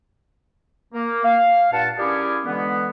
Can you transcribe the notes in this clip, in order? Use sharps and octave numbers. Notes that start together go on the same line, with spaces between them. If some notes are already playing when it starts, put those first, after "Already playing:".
A#3
F5
G2 A#2 F#5 A5
G3 C#4 E4 G4 G#4 A#4
D3 E3 G#3 B3